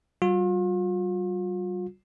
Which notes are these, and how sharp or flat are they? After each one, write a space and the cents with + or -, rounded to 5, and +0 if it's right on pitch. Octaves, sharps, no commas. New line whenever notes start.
G3 -40 F4 +40